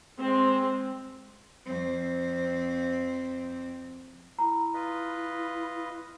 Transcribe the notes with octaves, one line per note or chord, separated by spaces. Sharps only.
G#3 C4
F2 C4
E4 A#5
F4 B4 D#5